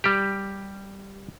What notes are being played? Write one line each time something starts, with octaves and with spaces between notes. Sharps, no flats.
G3 G4